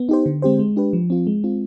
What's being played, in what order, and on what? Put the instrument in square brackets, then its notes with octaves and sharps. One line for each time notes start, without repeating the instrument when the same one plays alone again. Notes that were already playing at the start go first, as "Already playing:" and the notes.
Already playing: [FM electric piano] B3
D#4 G4 C5
D3
G#3 C4 G4 C5
G#3
D4 G4 B4
F3
C4 F4
G#3
C4 F4